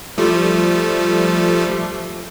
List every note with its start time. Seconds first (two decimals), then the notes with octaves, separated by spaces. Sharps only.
0.18 F3 G3 A3